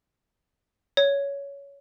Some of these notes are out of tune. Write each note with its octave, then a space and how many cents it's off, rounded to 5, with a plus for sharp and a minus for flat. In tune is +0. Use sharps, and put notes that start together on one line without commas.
C#5 +15